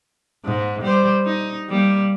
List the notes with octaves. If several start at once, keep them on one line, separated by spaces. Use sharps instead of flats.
G#2
G3 C5
D#4
G3 A#3